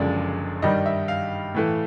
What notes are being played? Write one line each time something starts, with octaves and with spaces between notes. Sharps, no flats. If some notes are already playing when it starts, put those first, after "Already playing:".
Already playing: F#1 F#2 D3 F3 G#3 D5
G2 D#3 G3 D#5
E5
F5
A2 E3 A3